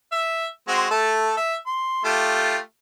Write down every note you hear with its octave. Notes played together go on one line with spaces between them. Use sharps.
E5
G#3 C4 F#4
A3 A4
E5
C6
A3 F4 G4